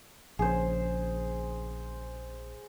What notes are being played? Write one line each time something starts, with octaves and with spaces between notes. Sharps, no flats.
A#1 C#3 G#4 C5